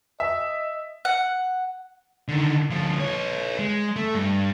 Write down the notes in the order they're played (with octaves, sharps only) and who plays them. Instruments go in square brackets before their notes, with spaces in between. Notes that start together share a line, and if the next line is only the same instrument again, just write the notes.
[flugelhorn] D#5 [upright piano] E5
[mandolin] F#5
[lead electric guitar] D3 D#3
D2 F3
B4 C#5
G#3
A3
G2